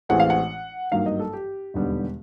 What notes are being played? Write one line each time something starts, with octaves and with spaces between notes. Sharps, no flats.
A1 A2 E3 G#3 C4 F#5
F5
F#5
G#1 G2 D#3 F#3 A#3 F5
D#5
A4
G4
E1 D#2 D3 G3 B3